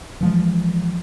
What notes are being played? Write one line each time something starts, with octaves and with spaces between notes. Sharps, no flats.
E3 F3 G#3